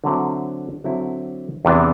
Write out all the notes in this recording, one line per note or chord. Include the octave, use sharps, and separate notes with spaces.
D3 F#3 C4 E4
D3 F#3 C4 E4
E2 C3 E3 B3 D4